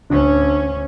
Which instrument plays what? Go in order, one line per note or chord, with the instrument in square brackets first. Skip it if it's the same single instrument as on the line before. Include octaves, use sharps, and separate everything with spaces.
[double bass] D2 C#4 [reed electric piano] D4